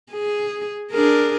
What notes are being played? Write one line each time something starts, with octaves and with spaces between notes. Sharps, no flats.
G#4
D4 G#4 A#4